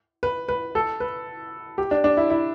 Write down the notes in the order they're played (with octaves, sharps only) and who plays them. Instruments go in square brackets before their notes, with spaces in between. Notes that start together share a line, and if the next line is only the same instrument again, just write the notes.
[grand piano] B4
B4
A4
B4
G4
D4
D4
E4
E4